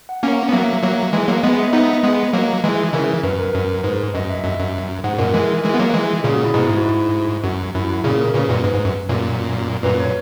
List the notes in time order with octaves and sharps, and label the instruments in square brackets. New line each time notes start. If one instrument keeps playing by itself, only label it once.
[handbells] F#5
[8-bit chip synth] A#3 C#4 [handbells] G#5
[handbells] F#5
[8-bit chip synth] B3
[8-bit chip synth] F#3 A#3 [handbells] E5
[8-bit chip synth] F#3 A#3
E3 G#3
F#3 A#3
[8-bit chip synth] G#3 B3 [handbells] D#5
[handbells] E5
[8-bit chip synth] B3 D#4 [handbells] D#5
[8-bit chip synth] G#3 B3
F#3 A#3
E3 G#3
[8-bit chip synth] C#3 E3 [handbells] A#4
[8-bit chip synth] F#2 [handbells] B4
[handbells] A#4
[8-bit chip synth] F#2 [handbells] A#4
[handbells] A#4
[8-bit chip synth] G#2 [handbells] B4
[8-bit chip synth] F#2 [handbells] D#5
[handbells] E5
[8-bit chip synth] F#2
F#2
[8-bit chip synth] G#2 [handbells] F#5
[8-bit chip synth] F#2 A#2 [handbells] A#4
[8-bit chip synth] E3 G#3 [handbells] A#4
[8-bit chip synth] E3 G#3
B3
F#3 A#3
E3 G#3
[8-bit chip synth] A#2 C#3 [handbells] G#4
[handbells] F#4
E4
[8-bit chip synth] G#2 B2 [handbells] D#4
[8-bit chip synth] G#2 [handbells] E4
[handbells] F#4
E4
[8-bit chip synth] F#2 [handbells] F#4
[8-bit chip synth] F#2 [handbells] E4
[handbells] F#4
[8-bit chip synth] A#2 C#3 [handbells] G#4
[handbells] A#4
[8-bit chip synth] A#2 C#3 [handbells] B4
[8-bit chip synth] F#2 A#2 [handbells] B4
[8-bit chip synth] G#2 [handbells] B4
[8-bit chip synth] G#2
F#2
F#2 A#2
[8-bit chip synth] F#2 A#2 [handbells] B4
[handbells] C#5